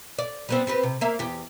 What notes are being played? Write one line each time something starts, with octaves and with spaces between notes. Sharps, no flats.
D5
G3 B3 C4
C4 G4 B4
C3
A#3 E5
E2 G4